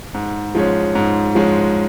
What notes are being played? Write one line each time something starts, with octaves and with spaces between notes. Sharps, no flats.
G#2
F3 G#3 C#4
G#2
F3 G#3 C#4